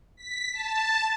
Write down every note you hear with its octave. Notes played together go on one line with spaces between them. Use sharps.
B6
A5